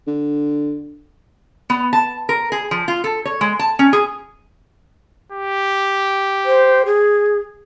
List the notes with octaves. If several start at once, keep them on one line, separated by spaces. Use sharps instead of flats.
D3
B3
A5
A#4
G#4
F3
F4
A4
C#5
G#3
A5
C#4
G#4
G4
C5
G#4